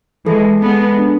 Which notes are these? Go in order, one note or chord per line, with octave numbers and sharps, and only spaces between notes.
E3 G#3 A4
G#3 B3 A4
D4